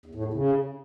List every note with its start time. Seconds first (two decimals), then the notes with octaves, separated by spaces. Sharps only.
0.06 E2
0.15 A2
0.24 E2
0.34 C#3